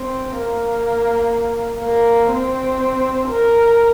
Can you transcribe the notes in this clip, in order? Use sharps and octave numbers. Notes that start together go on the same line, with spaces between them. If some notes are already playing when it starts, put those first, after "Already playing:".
Already playing: C4
A#3
A#3
C4
A#4